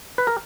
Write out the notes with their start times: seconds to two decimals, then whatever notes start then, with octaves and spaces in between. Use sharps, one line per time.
0.18 B4
0.27 A#4